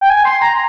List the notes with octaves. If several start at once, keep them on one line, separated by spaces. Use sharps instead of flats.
G5
G#5
C6
A#5